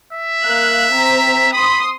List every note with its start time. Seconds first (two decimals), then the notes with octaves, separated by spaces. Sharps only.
0.13 E5
0.44 A#3 F5 F#6
0.92 C4 A#5 B6
1.53 B5 C6 D#6